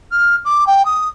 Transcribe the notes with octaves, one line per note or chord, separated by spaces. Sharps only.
F6
D6
G5
D#6